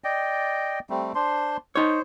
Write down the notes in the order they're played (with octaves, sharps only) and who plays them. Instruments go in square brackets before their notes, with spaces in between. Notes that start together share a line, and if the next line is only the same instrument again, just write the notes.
[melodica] D5 D#5 G5
G3 A3 C4
D4 C5 C6
[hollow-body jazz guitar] D#4 C#5 [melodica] C5